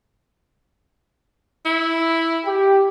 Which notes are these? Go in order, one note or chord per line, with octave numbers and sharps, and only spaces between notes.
E4
G4